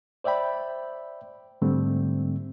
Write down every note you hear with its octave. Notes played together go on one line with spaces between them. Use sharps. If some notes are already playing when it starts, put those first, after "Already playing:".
C5 D5 E5 G5 B5
G#2 D3 G3 A3 C4